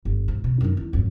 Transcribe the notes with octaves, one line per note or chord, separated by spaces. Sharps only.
G1
G#2
B2
F#2 D#4
E2
G#1 F2